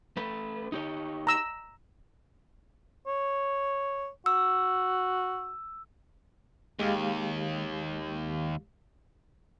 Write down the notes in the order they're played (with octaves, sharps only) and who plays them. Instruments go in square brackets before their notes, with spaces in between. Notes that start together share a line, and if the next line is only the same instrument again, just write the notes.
[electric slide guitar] A3 B4
D#4 G4 C#5
[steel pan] A#5 E6
[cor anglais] C#5
[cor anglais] F#4 [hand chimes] E6
[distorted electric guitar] D#2 [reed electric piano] G#3 G4 F5